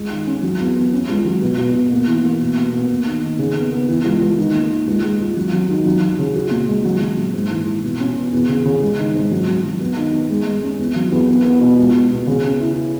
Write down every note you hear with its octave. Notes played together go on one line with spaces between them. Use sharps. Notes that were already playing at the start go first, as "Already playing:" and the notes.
Already playing: C#2 G#3
D#3
C#4
F#3
E2
B3
C#4
C#2
F#3
B2
B2
B2
A#3
E3
A#3
B2
B2
B3
A#3
D#3
D#3
C#3
B3
B3
E3
C#2
C#2
D#3
A#3
D#3
C#2
G#3
C#2
F#3
F#3
D#3
F#3
F#3
C#3
F#4
A#2
G#3
F#3
F#3
A#2
G#2
E3
E3
B2
C#4
B2
E2
C#3
C#3
G#3
D#3
G#2
F#3
F#3
F#3
B3
D#3
B3
G#3
G#3
C#4
E2
F#3
E2
B3
B3
B2
C#2
B2
B2
C#3
C#4
E4